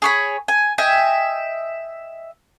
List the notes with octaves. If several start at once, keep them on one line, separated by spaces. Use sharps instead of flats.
G#4 C#5 B5
G#5
D#5 E5 G5 G#5